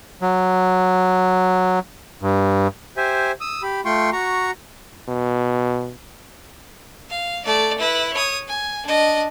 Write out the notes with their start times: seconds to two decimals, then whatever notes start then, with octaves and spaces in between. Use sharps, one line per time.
0.22 F#3
2.22 G2
2.97 G4 C5 E5 G#5
3.41 D#6 E6
3.63 G4 B5
3.85 A3 F4 G5 C6 C#6
4.13 F#4 A#5 C#6
5.08 B2
7.09 F5
7.45 A3 D5
7.78 E4 B4
8.14 C#5 D#6
8.47 G#5
8.86 D4 D#5